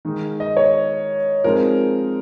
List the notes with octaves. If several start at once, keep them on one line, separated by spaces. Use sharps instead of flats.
D#3 G#3 D#4
D#5
C#5
F3 G#3 C4 D#4 A#4